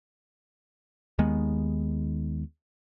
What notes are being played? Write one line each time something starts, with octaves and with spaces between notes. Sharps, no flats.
D#2 D#3 G#3 B3